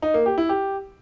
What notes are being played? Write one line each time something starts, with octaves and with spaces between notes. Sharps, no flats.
D#4
A#3
G4
E4
G4